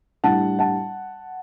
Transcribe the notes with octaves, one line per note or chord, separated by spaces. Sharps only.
A2 G3 D4 F#5 A5
F#5 A5